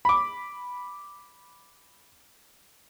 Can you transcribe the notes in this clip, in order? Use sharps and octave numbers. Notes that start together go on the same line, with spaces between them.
B5 D6